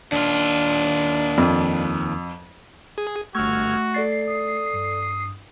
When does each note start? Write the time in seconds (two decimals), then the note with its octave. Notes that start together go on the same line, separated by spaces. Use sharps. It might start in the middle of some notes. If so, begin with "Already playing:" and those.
0.12 D#2 D4 F4
1.38 F2
2.98 G#4
3.35 G1 A3 F#4 C#6 E6 F6 G#6
3.94 A4 D5 A6 C7
4.29 D#6
4.74 G2